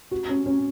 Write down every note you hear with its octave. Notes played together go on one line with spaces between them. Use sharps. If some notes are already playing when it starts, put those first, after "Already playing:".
F#4
C#4
C#4